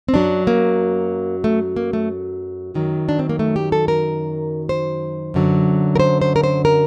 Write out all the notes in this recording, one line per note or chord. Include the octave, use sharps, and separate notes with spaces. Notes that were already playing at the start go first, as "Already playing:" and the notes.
C4
F#2 F#3 D4
A#3
A3
A#3
A3
F#2 D#3 F#3
D4
C4
A#3
A3
G4
A4
A#4
C5
F#2 D3 F#3
A#4
C5
C5
A#4
C5
A#4